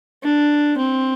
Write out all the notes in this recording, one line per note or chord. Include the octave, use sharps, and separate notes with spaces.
D4
C4